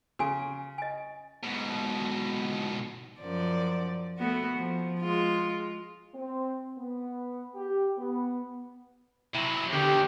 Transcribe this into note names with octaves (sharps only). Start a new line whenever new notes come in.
C#3 F#4 G#5
D#5 G#5
G#2 B2
F#2 F3 D5
A3 B3 F#4
F3
G#3 F4
C4
B3
G4
B3
C3 F#3 E4
E2 D3 D#3 G4